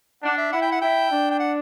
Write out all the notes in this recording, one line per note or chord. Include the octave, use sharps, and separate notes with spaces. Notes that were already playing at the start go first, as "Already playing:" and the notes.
D4 F#5
E5
E4 F#5
G5
F#5
E4 G5
D4
G5
F#5